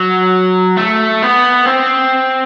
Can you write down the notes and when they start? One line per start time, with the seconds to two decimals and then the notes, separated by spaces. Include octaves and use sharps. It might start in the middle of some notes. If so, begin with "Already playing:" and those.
Already playing: F#3
0.77 A3
1.22 B3
1.66 C4